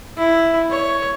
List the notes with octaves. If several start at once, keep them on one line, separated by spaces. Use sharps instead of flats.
E4
C#5